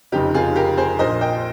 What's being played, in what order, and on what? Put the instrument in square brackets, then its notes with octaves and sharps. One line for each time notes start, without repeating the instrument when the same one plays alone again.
[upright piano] F1 F2 C#3 D#4 G4
F4 G#4
G4 A#4
G#4 C5
A#1 A#2 C5 D#5
D#5 G5